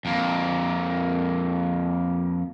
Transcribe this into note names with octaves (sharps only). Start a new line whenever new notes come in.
F2 A#3